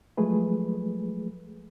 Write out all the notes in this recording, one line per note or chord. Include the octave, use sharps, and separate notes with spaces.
F3 F#3 G#3 A3 G#4 B4